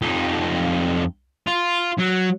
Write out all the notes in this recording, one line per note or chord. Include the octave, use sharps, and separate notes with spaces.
F2 D#4
F4
F#3